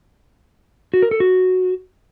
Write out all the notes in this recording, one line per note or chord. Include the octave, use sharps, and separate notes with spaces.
F#4
A#4
A4
F#4